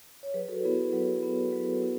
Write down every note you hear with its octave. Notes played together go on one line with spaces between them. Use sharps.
C#5
F#3 G#4 B4
F#4 A4
B3 E4 G#4 B4
F#3 G#4
B3 E4
B4
F#3 F#4 A4
B3 E4